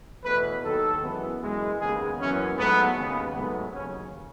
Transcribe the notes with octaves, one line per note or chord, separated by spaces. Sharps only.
E2 B2 A3 B4
D#2 D#3 F#3 A4
F#2 E3 G#3 B3
F#2 E3 G#3
D#2 C#3 G#3 B3 G#4
F#2 E3 B3 C#4
G#2 F#3 A3 B3
D#2 C#3 G#3 B3
G#2 F#3 A3 B3
D#2 C#3 F#3 C#4